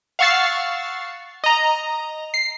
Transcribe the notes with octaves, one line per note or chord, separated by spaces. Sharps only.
F5 F#5 C#6 E6 A6 C7
D#5 A#5
C7